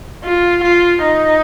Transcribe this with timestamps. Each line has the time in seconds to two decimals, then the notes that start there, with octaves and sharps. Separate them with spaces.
0.24 F4
0.63 F4
1.02 D#4